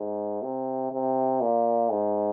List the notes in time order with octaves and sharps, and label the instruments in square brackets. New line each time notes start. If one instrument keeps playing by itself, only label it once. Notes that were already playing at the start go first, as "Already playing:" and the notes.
Already playing: [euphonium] G#2
C3
C3
A#2
G#2